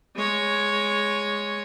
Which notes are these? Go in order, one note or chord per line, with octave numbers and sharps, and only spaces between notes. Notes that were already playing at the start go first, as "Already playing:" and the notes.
G#3 C#5